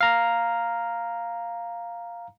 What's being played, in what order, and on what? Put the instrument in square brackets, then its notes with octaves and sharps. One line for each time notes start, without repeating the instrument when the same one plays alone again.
[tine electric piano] F5 A#5